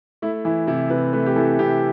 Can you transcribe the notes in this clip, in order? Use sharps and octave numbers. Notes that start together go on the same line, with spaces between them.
A3 E4
E3 E4
C3 E4
C3 B4
A3 B4
G4
E3 A4
C3 G4